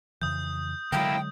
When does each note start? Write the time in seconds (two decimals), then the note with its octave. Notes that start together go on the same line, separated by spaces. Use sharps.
0.22 F2 C#3 E3 D#6 G6
0.92 D3 F#3 G#3 A#3 E4 G5